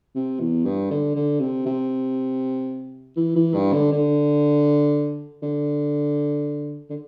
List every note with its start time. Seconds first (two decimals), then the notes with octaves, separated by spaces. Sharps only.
0.15 C3
0.40 E2
0.65 G2
0.91 D3
1.16 D3
1.40 C3
1.66 C3
3.17 E3
3.36 E3
3.55 G2
3.73 D3
3.92 D3
5.43 D3
6.90 D3